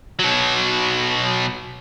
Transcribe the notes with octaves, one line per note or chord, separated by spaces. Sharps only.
B2 F#3